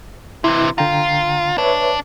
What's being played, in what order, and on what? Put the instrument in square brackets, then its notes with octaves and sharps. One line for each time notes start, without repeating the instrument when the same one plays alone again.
[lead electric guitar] C3 E3 [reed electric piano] E4
[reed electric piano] D3 G5 A#5 [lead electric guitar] F4
[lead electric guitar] D4 [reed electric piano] B4 C#5 E5